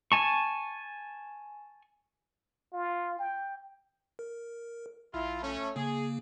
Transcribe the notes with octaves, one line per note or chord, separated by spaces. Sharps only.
G#5 A5 C#6
F4
G5
A#4
A#1 E4 F4
A3 C#4
C#3 A#3 G#4